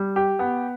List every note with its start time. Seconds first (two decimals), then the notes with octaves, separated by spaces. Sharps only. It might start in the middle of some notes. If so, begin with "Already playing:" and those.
Already playing: G3
0.16 G4
0.39 B3